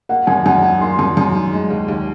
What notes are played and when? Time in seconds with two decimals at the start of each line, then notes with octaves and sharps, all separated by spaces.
0.09 A#3 F#5
0.27 F#2 G#5
0.46 F#2 F#5
0.63 D#3 G#5
0.81 A#3 C6
0.99 F#2
1.17 F#2
1.35 D#3
1.53 G#3
1.70 D#2
1.88 D#2